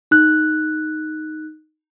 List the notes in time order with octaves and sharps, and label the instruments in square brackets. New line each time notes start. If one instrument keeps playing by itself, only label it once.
[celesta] D#4 F#6